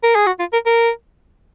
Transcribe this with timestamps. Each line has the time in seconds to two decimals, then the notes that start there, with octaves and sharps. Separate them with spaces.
0.03 A#4
0.15 G#4
0.27 F#4
0.39 F4
0.53 A#4
0.66 A#4